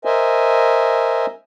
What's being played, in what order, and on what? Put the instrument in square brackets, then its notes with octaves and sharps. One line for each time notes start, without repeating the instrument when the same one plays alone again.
[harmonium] A#4 C5 D#5 E5 G#5